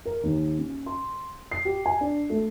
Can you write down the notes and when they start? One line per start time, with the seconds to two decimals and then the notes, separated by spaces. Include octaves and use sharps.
0.05 A#4
0.23 D#2
0.59 C#4
0.86 C6
1.52 C7
1.65 G4
1.86 G#5
2.01 D4
2.30 A3